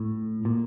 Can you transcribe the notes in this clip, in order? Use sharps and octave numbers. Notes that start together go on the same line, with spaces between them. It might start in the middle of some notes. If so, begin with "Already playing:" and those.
Already playing: A2
A#2